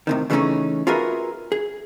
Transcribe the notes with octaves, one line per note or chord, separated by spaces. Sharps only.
A2 C3 D#3
C#3 E3 A3 C4 C#4 D#4
F4 F#4 G#4 A#4 B4 E5
G#4